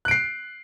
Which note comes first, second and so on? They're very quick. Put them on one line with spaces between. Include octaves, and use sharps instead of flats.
F#6 D7 C7